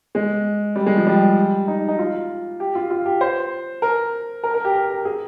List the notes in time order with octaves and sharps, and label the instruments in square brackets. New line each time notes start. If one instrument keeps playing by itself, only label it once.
[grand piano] G#3
G3
G#3
F3
G3
D#4
D#4
F4
G4
F4
F4
G4
C5
A#4
A#4
A#4
G4
A#4
A#4
G#4